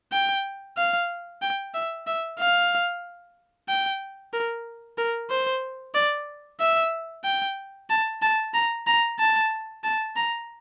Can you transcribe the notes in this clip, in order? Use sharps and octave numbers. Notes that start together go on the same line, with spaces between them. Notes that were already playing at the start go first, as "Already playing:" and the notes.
G5
F5
G5
E5
E5
F5
G5
A#4
A#4
C5
D5
E5
G5
A5
A5
A#5
A#5
A5
A5
A#5